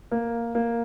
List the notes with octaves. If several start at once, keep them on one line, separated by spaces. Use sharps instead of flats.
A#3
A#3